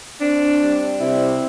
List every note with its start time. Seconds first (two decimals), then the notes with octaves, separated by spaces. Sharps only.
0.20 C4 D4
0.61 G3
1.00 C3 C4 E4